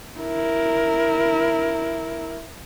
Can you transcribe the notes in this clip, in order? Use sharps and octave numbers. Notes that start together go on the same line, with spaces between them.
E4 A#4